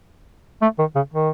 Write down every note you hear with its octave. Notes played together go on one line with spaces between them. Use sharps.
A3
D#3
C#3
D#3